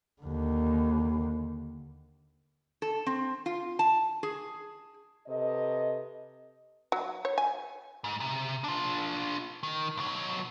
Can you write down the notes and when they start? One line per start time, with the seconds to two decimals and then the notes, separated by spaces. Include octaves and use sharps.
0.22 D#2 D3
2.82 A4
3.07 C4
3.46 F4
3.79 A5
4.23 G#4
5.27 C3 A4 B4 D#5
6.92 F#3
7.25 C#5
7.38 G#5
8.04 G#2
8.20 C3
8.64 D4 F4
9.63 D#3
9.97 B1 F#3